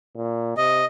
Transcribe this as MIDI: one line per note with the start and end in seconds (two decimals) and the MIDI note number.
0.16 0.53 46
0.57 0.83 48
0.57 0.85 75